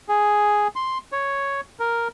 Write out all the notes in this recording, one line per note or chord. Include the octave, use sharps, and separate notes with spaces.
G#4
C6
C#5
A#4